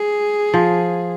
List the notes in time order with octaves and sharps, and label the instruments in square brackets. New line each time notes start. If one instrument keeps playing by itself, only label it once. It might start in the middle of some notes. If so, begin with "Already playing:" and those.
Already playing: [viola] G#4
[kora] F3